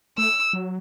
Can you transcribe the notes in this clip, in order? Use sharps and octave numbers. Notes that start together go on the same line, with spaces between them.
A3 E6
F#3